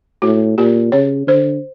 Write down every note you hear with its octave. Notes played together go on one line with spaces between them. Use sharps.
A2 F#4
A#2 G4
C#3 C#5
D3 C5